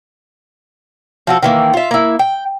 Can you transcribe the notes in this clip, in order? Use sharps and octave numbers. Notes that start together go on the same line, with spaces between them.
F3 F#4 A4
D#3 E3 A#3
F4 E5
A#3 E4
G5